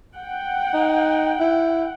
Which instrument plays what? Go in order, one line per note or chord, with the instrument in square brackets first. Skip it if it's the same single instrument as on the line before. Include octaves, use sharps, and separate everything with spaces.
[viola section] F#5 G5
[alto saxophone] D#4
E4